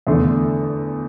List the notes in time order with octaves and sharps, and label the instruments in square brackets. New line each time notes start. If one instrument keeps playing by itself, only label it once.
[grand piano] E2 D3 A3